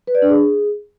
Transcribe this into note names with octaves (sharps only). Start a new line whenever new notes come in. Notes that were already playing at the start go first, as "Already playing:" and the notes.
B4
D5
D4
G#4